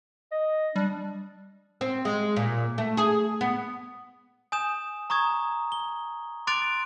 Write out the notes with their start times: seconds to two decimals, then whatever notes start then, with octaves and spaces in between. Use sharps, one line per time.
0.31 D#5
0.76 G3 D4
1.81 C4
2.05 G#3
2.36 A#2
2.78 A3
2.97 G#4
3.41 B3
4.52 G#5 D#6 G6 E7
5.10 A#5 C#6 D#6 G#6
5.72 G7
6.47 C6 D6 F#6 A6 D7 F7